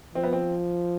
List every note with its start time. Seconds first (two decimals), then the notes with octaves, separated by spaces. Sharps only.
0.15 F3 C4
0.23 B3
0.33 C4